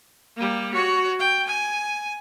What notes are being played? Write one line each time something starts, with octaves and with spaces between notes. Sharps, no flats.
G3 A#3
F#4 C#5
G5
G#5